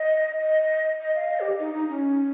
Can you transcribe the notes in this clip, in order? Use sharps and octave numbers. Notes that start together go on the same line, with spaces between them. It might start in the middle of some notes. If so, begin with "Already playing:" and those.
Already playing: D#5
D#5
D#5
F5
D#5
G4
D#4
D#4
C#4